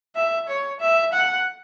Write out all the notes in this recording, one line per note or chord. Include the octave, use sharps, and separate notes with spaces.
E5
C#5
E5
F#5